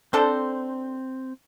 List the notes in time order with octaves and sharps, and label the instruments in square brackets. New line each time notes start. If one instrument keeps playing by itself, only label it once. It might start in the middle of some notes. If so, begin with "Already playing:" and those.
[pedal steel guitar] C4 [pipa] D4 A4 C5